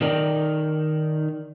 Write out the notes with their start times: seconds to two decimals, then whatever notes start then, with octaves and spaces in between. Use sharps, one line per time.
0.01 D#3 D#4 A#4 D5 G5